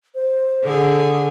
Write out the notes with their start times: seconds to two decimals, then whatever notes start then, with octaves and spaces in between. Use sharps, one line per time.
0.15 C5
0.63 D3 G#4 A4